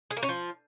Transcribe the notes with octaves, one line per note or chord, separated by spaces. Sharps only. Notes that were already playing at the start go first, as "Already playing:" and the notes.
G#4
A#3
C#4
F3